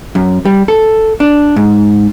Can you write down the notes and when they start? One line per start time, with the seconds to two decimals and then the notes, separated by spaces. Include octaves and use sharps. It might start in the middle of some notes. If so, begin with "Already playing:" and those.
0.15 F#2
0.45 G3
0.68 A4
1.20 D4
1.56 G#2